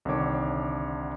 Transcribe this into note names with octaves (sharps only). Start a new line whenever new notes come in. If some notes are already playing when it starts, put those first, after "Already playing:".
C2 D3 D#3 D4 C#5 D6